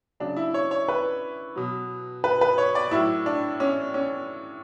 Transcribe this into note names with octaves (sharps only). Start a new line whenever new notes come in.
C#3 F#3 D4
E4
C#5
C#5
B4
B2 F#3
B4
B4
C#5
D5
A2 F#3 E4
D4
C#4
C#4